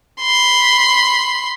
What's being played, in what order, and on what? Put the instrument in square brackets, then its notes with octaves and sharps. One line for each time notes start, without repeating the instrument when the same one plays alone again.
[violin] B5 C6